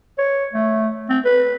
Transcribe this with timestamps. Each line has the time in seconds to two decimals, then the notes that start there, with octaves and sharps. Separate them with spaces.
0.18 C#5
0.53 A3
1.09 C4
1.25 B4